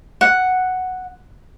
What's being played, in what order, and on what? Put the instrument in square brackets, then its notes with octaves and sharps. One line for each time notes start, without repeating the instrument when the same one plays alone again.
[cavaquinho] F#5